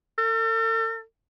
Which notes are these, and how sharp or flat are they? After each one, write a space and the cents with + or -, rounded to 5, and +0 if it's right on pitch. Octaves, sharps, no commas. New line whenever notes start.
A4 +45